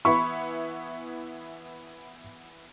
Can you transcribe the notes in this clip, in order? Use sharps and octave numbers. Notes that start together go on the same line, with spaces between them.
E3 B3 E4 B5 C#6